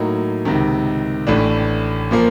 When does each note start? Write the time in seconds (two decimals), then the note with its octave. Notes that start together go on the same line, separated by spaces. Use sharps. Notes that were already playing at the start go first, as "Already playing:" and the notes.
Already playing: A2 F#3 A#3 D#4
0.45 C#2 C3 D#3
1.27 A1 A2 E3 A3 D4
2.11 A#2 F3 A#3